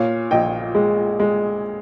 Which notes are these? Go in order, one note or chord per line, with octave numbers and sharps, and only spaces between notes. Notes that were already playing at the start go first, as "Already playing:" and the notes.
Already playing: A#2 C#5 F5
A#1 D#5 G5
G#3
G#3